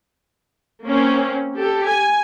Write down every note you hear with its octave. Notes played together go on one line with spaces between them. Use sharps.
A#3 C4 C#4
G4 A4
G#5